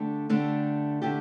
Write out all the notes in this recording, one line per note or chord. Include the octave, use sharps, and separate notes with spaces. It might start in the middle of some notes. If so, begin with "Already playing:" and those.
Already playing: D3 A3 D4 G4
D3 A3 D4 G4
D3 A3 D4 G4